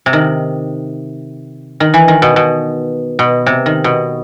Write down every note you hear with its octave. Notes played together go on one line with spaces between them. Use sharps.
C3
D#3
D#3
E3
D#3
B2
B2
B2
C3
D#3
B2